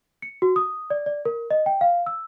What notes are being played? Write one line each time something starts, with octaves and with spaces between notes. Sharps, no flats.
C#7
F#4
D#6
D5
D5
A#4
D#5
G5
F5
E6